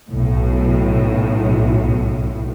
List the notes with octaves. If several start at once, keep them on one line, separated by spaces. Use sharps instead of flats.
B1 A2